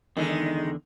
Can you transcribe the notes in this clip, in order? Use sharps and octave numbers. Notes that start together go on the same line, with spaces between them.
E2 D3 D#3 G#3